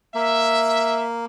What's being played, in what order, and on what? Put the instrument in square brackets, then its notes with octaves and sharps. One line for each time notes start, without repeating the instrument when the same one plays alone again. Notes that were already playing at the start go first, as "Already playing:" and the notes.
[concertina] A#3 [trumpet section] E5